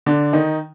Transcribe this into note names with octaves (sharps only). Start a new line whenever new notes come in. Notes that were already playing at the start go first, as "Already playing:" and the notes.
D3 D4
D#3 D#4